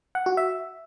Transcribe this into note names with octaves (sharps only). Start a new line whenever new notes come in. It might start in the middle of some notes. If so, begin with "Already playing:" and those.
F#5
F#4
E5